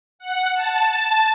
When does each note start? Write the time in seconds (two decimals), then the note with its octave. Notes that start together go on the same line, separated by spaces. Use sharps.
0.19 F#5
0.54 A5